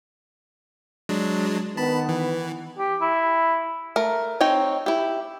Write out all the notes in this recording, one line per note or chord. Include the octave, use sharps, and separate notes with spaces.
F#3 G#3 D4
D#3 B3 A5 B5
E3
G4
E4
A3 A#4
C4 D#4 C#5 G5
E4 G4